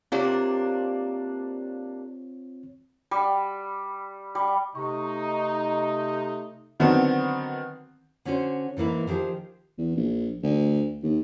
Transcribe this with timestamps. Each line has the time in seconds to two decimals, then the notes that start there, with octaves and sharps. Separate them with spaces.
0.12 C3 A#3 C4 D4 F4 C#5
3.11 G3
4.35 G3
4.75 C3 A3 D#4 C#6
6.80 D3 D#3 F#3 B3 C4
8.25 D3 C#4 D4 F#4 C5
8.77 G#2 E3 A#3 E4
9.07 D#3 F3 G4 G#4 C5
9.78 E2
9.96 A#1
10.43 D2
11.03 D#2